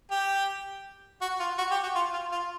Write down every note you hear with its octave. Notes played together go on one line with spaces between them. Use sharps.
G4
F#4
F4
F#4
G4
F#4
F4
F4
F4